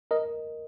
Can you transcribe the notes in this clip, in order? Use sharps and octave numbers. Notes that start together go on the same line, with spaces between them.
A#4 D#5